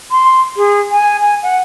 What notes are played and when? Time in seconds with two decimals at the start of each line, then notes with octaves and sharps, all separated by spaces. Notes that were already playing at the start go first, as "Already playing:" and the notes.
0.11 C6
0.57 G#4
0.91 G#5
1.21 G#5
1.43 F#5